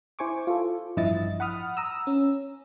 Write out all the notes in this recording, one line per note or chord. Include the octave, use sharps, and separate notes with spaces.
E4 C5 G#5 C#6 D6
F4 A4
A1 G2 F3 E4 D#5 A6
F#5 B5 D#6 F6
A#5 D#6 E6
C#4